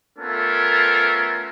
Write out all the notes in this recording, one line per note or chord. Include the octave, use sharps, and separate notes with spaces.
A3 B3 C#4 F4 A4 A#4